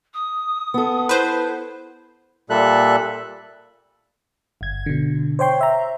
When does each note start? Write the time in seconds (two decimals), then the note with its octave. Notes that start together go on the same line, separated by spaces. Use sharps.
0.14 D#6
0.74 B3 A4
1.09 E4 B4 C5
2.50 A#2 G3 A4 E5 F#6
4.61 G1 G#6
4.86 B2 D3
5.39 C5 C#5 G5 C6
5.61 E5 A#5